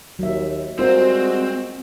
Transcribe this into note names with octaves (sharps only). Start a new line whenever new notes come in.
D#2 F#3 E5
G3 G#3 C4 F4 F#4 A#4 C5